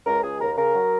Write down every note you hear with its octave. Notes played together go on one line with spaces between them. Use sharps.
C#2 A#4
C#2 G#4
D#2 A#4
C#3 A#4
F#3